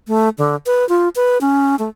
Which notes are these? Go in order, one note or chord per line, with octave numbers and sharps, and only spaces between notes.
A3
D3
B4
F4
B4
C#4
A3